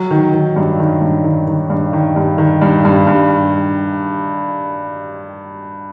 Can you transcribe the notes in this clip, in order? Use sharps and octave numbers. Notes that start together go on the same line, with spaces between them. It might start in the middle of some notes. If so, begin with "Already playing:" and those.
Already playing: F#3
D#3
D#3
G2
D#3
G2
D#3
D#3
G2
D#3
G2
D#3
G2
G2
G2